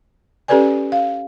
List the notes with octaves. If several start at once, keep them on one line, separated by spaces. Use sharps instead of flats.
C#4 G4 A4 B4 D5 G#5
F5